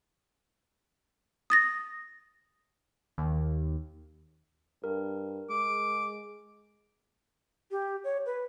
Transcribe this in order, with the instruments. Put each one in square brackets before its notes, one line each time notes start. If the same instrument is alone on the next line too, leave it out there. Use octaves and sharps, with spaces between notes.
[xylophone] D#6 A6 A#6
[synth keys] D#2
[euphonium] G2 [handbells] A#4
[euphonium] G#3 [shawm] D6
[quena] G4
C#5
B4